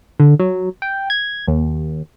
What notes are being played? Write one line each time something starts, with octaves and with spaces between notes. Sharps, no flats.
D3
F#3
G5
G#6
D#2